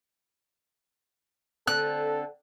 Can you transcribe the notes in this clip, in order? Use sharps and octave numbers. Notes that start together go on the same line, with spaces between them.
D3 C4 A4 F#6